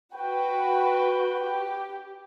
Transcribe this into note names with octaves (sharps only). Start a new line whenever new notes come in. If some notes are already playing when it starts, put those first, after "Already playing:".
F#4 B4 G5
G4